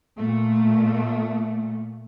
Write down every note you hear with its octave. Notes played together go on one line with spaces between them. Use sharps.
A#2 A3